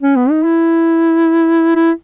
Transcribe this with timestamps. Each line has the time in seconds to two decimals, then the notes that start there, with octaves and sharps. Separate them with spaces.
0.02 C#4
0.16 B3
0.31 D#4
0.45 E4
1.75 E4